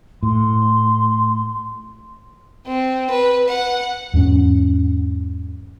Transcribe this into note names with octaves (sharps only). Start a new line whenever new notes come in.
A2 C6
C4
B4
F#5
E2 G#2 C#4